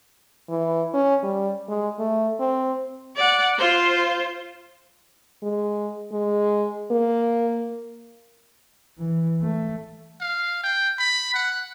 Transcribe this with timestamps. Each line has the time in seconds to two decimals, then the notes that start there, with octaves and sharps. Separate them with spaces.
0.49 E3
0.94 C#4
1.23 G3
1.69 G#3
1.99 A3
2.40 C4
3.16 D5 F#5
3.59 F4 C5
5.42 G#3
6.12 G#3
6.91 A#3
8.98 E3
9.42 A3
10.21 F5
10.64 G5
10.99 B5
11.34 F#5